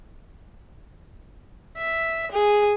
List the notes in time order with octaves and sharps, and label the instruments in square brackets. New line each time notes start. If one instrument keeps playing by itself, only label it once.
[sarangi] E5
G#4